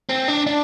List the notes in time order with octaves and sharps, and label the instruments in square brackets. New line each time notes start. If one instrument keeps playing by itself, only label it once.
[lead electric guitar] C4
D4
D4